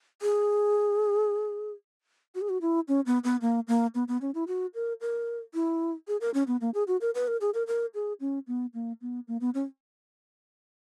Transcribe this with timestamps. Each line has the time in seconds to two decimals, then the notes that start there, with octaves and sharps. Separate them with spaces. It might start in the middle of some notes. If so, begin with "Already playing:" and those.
0.22 G#4
2.35 F#4
2.41 G#4
2.49 F#4
2.61 E4
2.88 C#4
3.06 B3
3.24 B3
3.41 A#3
3.68 A#3
3.95 B3
4.08 B3
4.21 C#4
4.35 E4
4.48 F#4
4.74 A#4
5.01 A#4
5.54 E4
6.08 G#4
6.21 A#4
6.34 C#4
6.47 B3
6.61 A#3
6.74 G#4
6.88 F#4
7.01 A#4
7.15 B4
7.28 A#4
7.41 G#4
7.54 A#4
7.67 A#4
7.94 G#4
8.20 C#4
8.47 B3
8.74 A#3
9.01 B3
9.28 A#3
9.41 B3
9.54 C#4